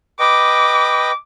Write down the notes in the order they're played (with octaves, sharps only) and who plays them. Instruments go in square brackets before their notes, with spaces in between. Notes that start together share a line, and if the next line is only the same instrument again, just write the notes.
[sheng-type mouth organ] B4 D#5 G5 [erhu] D6